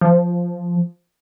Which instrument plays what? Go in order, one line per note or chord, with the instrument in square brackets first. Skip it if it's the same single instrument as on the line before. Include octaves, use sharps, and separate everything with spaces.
[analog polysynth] F3